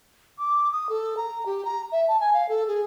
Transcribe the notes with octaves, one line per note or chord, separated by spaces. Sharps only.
D6
D#6
A4
A#5
G4
A#5
E5
A5
G#5
F5
A4
G#4